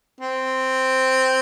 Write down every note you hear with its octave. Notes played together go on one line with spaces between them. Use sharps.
C4